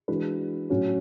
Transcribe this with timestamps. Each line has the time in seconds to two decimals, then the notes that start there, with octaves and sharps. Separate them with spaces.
0.08 E3 G#3 D4 F#4 B4
0.70 A2 F#3 C#4 F#4 C#5